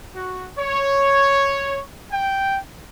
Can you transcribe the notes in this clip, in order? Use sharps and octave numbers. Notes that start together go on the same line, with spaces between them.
F#4
C#5
G5